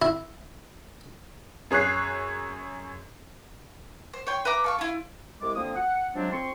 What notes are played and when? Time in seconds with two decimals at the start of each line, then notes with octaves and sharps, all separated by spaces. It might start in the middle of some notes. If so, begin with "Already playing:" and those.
0.02 E4
1.71 F#2 G#4 C#5 F#6 C7
4.14 C5
4.27 C#5 G5 C6
4.45 B4 E5 A#5 D6
4.64 A4 F5 C#6
4.79 E4 F4
5.41 C2 G#3 D6
5.56 D3 F3 A#3 C4 D#6
5.75 F#5
6.14 C3 F3 F#3 G#3 C4 D4
6.32 F2 C4 C6 C#6